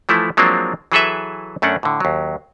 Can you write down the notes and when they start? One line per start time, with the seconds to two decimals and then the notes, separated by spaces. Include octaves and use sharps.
0.09 E3 F3 A3 E4
0.37 F3 F#3 G#3 A#3 C4 D4
0.92 E3 F#3 G#4 A4 B4 E5
1.62 F#2 A3 C#4 D4 F#5
1.83 A2 D3
2.00 D#2 F#3